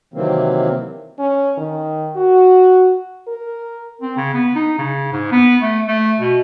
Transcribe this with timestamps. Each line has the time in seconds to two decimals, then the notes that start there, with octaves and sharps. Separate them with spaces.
0.14 C3 D#3 E3 F#3 A#3 C4
1.19 C#4
1.58 D#3
2.16 F#4
3.28 A#4
4.01 C4
4.17 C#3
4.34 B3
4.55 D#4
4.78 C#3
5.12 G#2
5.32 B3
5.62 A3
5.88 A3
6.19 B2